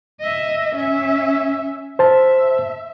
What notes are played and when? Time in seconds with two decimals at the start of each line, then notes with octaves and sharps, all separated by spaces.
0.20 D#5 E5
0.75 C#4 E5
1.99 C5 E5 A5